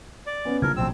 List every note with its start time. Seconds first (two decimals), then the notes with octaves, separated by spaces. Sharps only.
0.27 D5
0.45 B3 C#4
0.62 A#1 C#3 F3 A#4 G#6
0.76 A1 B2 F#3 C4 E6